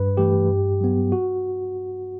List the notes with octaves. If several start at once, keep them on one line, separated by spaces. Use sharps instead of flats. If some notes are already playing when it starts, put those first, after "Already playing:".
Already playing: G2 B4
E3 A3 G4
G2
F#3 B3
F#4